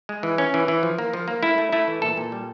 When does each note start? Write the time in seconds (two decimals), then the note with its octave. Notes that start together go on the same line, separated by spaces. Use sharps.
0.09 G#3
0.23 E3
0.38 C#4
0.54 E3
0.68 E3
0.83 F3
0.98 A#3
1.13 F3
1.28 A#3
1.43 A3 E4
1.58 A3
1.72 A3 E4
1.88 E3
2.02 A#2 A4
2.17 A#2
2.32 G3